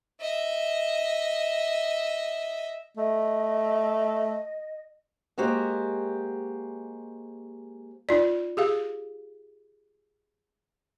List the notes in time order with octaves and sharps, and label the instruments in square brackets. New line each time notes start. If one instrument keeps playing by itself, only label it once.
[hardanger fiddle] D#5 E5
[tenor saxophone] A3 [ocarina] D#5
[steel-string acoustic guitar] G#3 A#3 F#4 G4 C5
[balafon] D#4 F4 D5
G4 G#4 F5